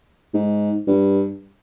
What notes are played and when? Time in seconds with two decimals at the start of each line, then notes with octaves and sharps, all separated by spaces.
0.34 G#2
0.87 G2